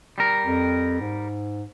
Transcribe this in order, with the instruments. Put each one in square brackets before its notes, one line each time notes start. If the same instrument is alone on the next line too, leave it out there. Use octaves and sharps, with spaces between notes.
[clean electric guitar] G3 A#4
[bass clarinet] F2
G#2